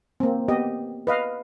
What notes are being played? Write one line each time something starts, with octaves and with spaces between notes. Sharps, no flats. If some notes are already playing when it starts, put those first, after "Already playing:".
A#3 C4
B3 G4 D#5
B4 D#5 F5